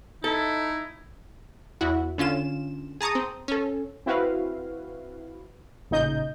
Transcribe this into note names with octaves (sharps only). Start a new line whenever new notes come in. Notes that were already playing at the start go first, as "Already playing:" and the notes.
D#4 E4 A4
E2 E4 F#4
D3 C#4 F4 E7
G#4 A5 A#5 C#6 D#6
C4
C#4 A4
C4 E4 F#4 B4 F5
A1 A#2 C#3 D#4 D#5 G6